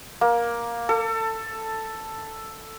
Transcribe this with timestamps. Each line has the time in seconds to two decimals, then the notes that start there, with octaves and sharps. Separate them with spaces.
0.21 A#3
0.89 A4